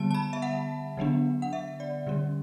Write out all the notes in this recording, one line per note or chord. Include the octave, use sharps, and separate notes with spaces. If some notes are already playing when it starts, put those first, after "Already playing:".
Already playing: D3 G3 B3 A5
A5
B5
E5
F#5
D3 F#3 B3 D4
F#5
E5
D5
D3 G3 C#4